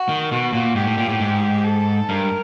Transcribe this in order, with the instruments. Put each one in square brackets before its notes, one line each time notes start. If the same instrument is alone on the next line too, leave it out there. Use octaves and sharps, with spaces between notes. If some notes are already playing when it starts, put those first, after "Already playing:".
Already playing: [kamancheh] F#4
[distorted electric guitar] D#3
[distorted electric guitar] B2 [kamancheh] F#4
[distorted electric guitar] A#2
[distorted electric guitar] G#2 [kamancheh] G4
[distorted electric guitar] A2
A#2
A2
G#2
[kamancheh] A4
[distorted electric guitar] G2 [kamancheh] A#4